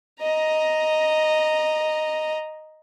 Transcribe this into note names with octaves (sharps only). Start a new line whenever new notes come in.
D#5 A#5